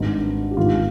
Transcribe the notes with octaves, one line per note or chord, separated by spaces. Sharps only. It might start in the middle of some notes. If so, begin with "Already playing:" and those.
Already playing: G#1 G2 D#3
G4
G#1 G#2 D#3 F4